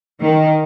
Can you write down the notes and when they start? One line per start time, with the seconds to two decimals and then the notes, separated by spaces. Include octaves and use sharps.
0.20 D#3